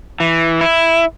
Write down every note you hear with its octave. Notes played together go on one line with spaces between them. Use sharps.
E3
E4